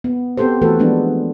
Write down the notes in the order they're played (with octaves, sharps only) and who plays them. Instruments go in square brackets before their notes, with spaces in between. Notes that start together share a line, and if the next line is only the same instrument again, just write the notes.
[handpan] B3
B3 C4 G4 A4 C5
E3 A3 F#4 A4 B4
F3 G#3 B3 D4